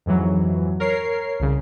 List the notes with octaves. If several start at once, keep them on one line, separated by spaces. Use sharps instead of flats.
F2 G#2 E3 F#3
A#4 C#5 C7
C2 C#3